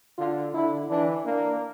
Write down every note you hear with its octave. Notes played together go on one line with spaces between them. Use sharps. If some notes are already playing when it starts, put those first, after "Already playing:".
D3 F4
D3 E4
E3 D4
A#3 D4